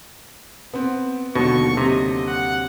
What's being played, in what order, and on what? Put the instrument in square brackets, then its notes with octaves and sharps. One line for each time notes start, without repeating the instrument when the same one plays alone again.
[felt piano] B3 C4
[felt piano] D#2 D3 F#3 [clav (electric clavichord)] B2 [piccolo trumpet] C#6
[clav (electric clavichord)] C3 [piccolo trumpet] D#5
[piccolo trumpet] F#5